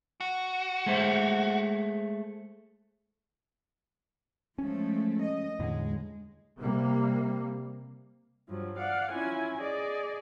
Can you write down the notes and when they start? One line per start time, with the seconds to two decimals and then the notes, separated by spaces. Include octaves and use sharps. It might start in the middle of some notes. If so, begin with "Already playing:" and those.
0.20 F#4
0.86 G#3 A3 C5
4.58 F3 G#3 A3 C#4
5.21 D#5
5.59 E2 A2 D3 G#3
6.58 C3 G3 A#3
8.49 G2 F3 F#3
8.78 D5 F5 F#5
9.10 C#4 E4 F4 G#5
9.61 G#4 D5 D#5